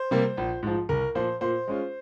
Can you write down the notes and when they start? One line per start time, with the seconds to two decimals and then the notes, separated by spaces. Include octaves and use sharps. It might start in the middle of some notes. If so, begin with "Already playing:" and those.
Already playing: C5
0.11 C3 G3 A#3
0.37 A#1
0.63 G#2 F3
0.89 C2 A#4
1.15 A#2 F3 C5
1.41 A#2 C5
1.68 G#3 C#4 F4